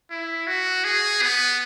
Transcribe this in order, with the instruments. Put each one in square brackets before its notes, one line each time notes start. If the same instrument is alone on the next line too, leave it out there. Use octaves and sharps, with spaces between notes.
[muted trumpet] E4
F#4
G#4
B3